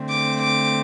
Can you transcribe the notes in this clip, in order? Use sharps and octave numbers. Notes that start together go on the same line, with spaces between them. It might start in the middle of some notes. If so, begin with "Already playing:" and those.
Already playing: D3 A3 C4
D6
D6